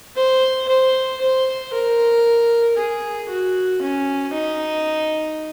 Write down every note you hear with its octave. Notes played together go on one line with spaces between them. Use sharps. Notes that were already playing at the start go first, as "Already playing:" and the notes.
C5
C5
C5
A#4
G#4
F#4
C#4
D#4